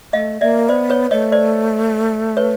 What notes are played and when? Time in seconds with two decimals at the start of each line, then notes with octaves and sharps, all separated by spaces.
0.13 A3 D#5 F5
0.41 A#3 D5 E5
0.69 B3 C5 D5
0.90 B4 C#5
1.11 A3 C#5 D#5
1.32 C5 D5
2.37 B4 C#5